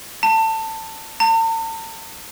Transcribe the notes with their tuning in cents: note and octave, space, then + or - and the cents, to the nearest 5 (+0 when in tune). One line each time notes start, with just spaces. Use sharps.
A5 +20
A5 +45